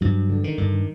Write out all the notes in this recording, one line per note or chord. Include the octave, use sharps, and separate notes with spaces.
G2 F#3
D3
D#3
G2